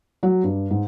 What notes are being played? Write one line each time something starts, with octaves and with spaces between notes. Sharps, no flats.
F#3
G2
G#2